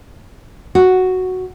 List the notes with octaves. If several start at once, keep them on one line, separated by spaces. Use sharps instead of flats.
F#4